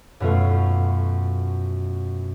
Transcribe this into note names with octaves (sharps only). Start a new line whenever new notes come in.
F#2 B2 A3 F4